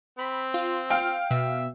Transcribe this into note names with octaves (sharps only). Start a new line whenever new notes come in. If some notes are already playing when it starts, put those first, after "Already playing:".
C4 B5
F4
F5 G5
B2 E5